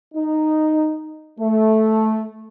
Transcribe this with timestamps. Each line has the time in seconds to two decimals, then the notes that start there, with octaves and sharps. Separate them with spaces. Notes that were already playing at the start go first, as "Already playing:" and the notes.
0.15 D#4
1.40 A3